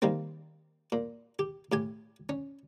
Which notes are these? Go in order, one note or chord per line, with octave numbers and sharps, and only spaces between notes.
D#3 G3 A#3 C4
A#2
G4
A2 G4 G#5
C#4